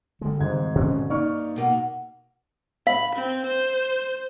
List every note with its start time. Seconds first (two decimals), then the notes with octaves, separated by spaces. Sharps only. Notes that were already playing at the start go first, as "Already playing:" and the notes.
0.21 D3 G3 G#3
0.39 G#1 G#2 C#3 G#6
0.75 B2 D3 F3 C#4
1.10 G2 A#3 D#4 D5 C#6 F6
1.56 B2 A#3 F#4
2.87 F5 B5
3.15 C4
3.46 C5